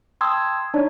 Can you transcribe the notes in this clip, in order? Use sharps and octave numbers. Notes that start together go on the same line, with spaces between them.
G5 A5 C6 D#6 E6 G#6
D4 D#4 C#5 D5